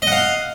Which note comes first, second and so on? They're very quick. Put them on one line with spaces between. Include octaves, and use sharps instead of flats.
D#5 F#5 F5